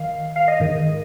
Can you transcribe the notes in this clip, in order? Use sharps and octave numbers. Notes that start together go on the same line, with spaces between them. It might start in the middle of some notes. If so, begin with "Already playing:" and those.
Already playing: D#3 F5
F5
D#5
G#2 D#3